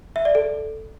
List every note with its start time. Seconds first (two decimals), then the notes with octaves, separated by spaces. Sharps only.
0.16 E5
0.25 D5
0.35 A4